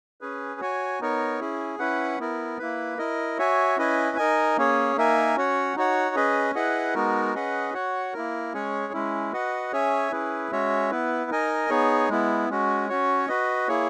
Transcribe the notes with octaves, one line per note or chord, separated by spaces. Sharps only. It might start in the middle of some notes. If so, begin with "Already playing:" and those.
C#4 G#4 B4
F#4 C#5 G#5
B3 D#4 A#4 C#5
C#4 E4 G#4
C#4 E4 B4 F#5
B3 E4 A#4
A#3 E4 B4
E4 A#4 D#5
F#4 C#5 E5 G#5
C#4 E4 B4 D#5 G#5
D#4 A#4 D#5 G#5
A#3 C#4 G#4 C#5
A#3 D#4 A#4 E5 G#5
C#4 F#4 C#5 F#5
D#4 F#4 C#5 F#5
C#4 G#4 B4 D#5
E4 G#4 B4 D#5 F#5
G#3 B3 D#4 F#4 A#4
C#4 G#4 B4 D#5 F#5
F#4 C#5 F#5
A#3 E4 A#4
G#3 C#4 G#4 C#5
G#3 C#4 E4
F#4 B4 D#5 F#5
C#4 G#4 C#5 E5 G#5
C#4 E4 G#4 B4
G#3 C#4 F#4 C#5 E5
B3 E4 B4
D#4 A#4 D#5 G#5
B3 D#4 G#4 C#5
G#3 B3 E4
G#3 C#4 F#4
C#4 F#4 C#5
F#4 B4 D#5
A#3 E4 G#4 C#5